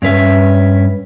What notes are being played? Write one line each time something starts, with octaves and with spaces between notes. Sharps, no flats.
G2 C#4 B4 E5